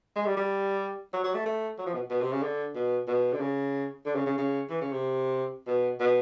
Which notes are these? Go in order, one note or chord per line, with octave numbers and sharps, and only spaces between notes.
G#3
G3
G3
F#3
F#3
A3
A3
F#3
F3
B2
B2
C3
C#3
D3
B2
B2
D3
C#3
D3
C#3
C#3
C#3
E3
C#3
C3
B2
B2